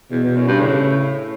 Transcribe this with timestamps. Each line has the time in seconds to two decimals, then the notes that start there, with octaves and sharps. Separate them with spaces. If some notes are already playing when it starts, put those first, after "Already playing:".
0.11 E2 B2
0.23 E2
0.36 F#2
0.47 G2
0.59 A2 C#3